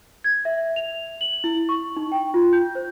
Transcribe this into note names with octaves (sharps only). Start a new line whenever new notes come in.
G#6
E5
F7
F#7
E4
C#6
D#4
G5
F4
G6
C5